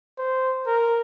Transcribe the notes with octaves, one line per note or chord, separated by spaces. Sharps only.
C5
A#4